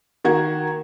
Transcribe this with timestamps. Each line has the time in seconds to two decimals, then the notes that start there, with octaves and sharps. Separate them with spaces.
0.24 D#3 A#3 F#4 G#6